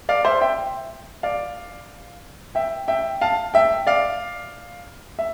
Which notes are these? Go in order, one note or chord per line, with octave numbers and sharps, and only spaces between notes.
D5 F5
C5 E5
E5 G5
D5 F5
E5 G5
E5 G5
F5 A5
E5 G5
D5 F5
E5